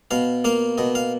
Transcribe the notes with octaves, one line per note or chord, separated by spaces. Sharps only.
B2 F5
A#3 F5
B2 D#5
F5